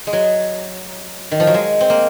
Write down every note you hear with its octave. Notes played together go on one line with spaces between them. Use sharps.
G#3
F#3
D#3
F3
F#3
G#3
C4
A#3